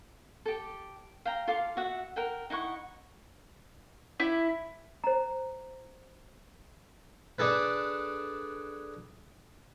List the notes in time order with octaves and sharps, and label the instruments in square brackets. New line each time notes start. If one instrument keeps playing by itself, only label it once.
[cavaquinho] G4 A4
F5 G5 A#5
F4 A4 F5 D6
F#4 E5 F#5
A#4 F#5 G5
D#4 E4 F#5 C#6
[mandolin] E4
[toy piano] C5 A#5
[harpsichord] D4 G#4 A4 B4